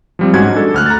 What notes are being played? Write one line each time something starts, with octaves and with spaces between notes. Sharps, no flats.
F3 G3 C4
G#2 G#3 C#4 F#4 G#6
D4 A4
D2 F6 F#6
A#5 A6